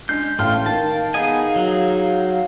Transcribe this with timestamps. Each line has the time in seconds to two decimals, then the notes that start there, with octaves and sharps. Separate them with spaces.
0.09 G#3 C#4 D4 G6 C7
0.39 A1 A3 F5 G5 A5 C6 F6
0.66 D#3 A#3 A5
1.14 B3 D#4 G#4 D#5 G#5
1.56 F#3